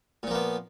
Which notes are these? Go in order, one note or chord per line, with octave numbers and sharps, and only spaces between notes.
A#2 F3 A#3 B3